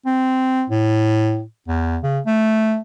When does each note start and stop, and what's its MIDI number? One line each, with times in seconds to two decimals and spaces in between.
0.06 0.64 60
0.69 1.43 45
1.68 1.98 40
2.03 2.20 49
2.26 2.78 57